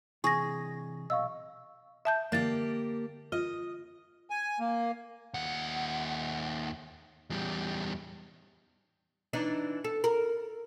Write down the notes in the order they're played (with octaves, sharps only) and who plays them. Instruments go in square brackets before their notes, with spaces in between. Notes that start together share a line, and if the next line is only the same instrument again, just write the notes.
[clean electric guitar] C3 E3 [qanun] G#4 [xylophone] C#6 A#6
[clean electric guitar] B1 [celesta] D#5 F5 C#6 [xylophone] E6
[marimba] E5 A5 G6
[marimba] D3 A6 [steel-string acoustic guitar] A#3 G4
[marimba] F4 [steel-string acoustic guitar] D#5
[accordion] G#5
A#3
[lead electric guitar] D#2 F#5
E2 G3
[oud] E3 D4 D#4
A4
A#4